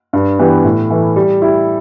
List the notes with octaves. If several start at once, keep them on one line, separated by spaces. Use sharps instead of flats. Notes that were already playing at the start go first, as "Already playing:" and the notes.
G2
E3 B3 G4
A2
E3 A3 E4
G3
E4 G4